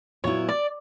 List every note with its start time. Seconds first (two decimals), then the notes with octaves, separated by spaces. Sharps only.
0.24 A#2 F#3 B3 E4 C#5
0.49 D5